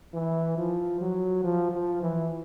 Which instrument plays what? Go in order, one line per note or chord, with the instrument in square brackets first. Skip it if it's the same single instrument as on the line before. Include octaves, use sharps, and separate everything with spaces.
[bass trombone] E3
F3
F#3
F3
F3
E3